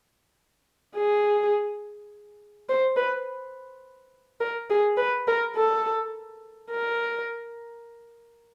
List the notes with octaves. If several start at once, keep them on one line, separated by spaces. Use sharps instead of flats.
G#4
C5
B4
A#4
G#4
B4
A#4
A4
A#4